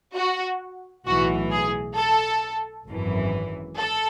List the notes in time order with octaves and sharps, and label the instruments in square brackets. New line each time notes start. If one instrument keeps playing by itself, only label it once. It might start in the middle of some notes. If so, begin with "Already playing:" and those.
[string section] F#4
B1 A2 E3 F#4
G#4
A4
G#1 F#2 E3
A4